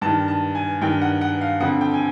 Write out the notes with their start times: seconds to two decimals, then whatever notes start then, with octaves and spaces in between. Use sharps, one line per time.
0.01 G2 A5
0.06 D#3
0.28 A5
0.55 G#5
0.81 G2 D#3 G5
1.01 F#5
1.21 F#5
1.41 F5
1.60 F2 D3 F#5
1.81 G5
1.94 G#5